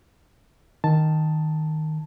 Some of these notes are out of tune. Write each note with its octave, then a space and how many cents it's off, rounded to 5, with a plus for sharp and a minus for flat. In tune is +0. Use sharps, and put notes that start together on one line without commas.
D#3 +0 A5 +0